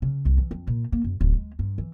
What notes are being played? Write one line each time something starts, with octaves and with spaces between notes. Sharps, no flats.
C#3
C2
E3
F2
A#2
A#3
F#2
D1
G#3
G2
E3